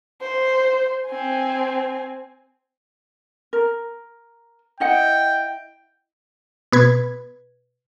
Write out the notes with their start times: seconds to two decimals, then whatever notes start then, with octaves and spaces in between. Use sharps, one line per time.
0.21 C5
1.09 C4 G#5
3.53 A#4
4.80 E4 D#5 F#5 G5
6.72 B2 B4 G#6